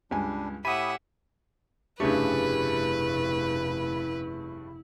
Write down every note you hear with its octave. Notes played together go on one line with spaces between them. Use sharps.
C#2 G2 G3 D4 G#5
A2 G4 E5 F#5 G#5 B5 D#6 D#7
F1 G2 C#3 A3 E4 G4 G#4 B4